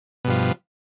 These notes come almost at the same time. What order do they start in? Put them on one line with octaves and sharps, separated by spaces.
B2 G2 F3